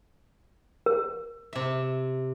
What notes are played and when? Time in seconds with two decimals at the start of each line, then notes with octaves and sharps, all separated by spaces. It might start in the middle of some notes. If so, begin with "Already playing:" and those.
0.86 A#4
1.53 C3 E5